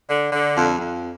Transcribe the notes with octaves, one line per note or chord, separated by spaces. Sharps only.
D3
D3
F2
F2